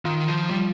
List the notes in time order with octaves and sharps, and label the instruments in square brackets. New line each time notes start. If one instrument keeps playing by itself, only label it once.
[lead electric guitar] D#3 [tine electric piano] F4
[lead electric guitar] F3
G3